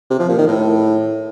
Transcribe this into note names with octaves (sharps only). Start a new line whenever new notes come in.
C3
F3
A#2
D#3
A2